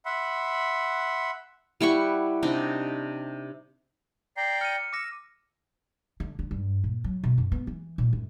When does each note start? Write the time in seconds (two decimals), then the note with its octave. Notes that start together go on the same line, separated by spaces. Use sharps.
0.06 E5 F#5 B5 C6
1.81 G3 E4 F#5 C#6
2.43 C3 D4 D#4
4.37 D5 G5 A#5 C7
4.61 F6 C#7 D#7
4.93 D6 E6 A#6
6.20 D3
6.39 D3
6.51 G2
6.84 A#2
7.04 F#3
7.24 B2
7.38 F#2
7.52 B3
7.67 E3
7.98 A#2
8.13 F#2